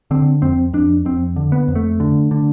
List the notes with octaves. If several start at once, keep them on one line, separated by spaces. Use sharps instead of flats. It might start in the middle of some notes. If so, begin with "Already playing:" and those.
D3 C4
F2 C4
F2 D4
F2 C4
D3
B3
F2
A3
D3
D3